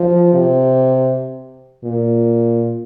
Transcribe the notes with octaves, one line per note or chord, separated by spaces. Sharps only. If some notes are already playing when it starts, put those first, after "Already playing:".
Already playing: F3
C3
A#2